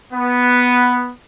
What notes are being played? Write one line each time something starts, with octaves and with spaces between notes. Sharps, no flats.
B3